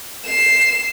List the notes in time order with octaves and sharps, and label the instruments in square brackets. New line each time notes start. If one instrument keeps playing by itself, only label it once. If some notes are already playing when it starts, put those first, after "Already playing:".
[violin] C7 E7